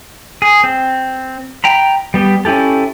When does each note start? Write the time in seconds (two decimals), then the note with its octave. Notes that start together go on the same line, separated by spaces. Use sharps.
0.42 G#4
0.64 C4
1.64 G5 A#5 B5
2.14 G3 B3 G4
2.45 C#4 E4 G4 A4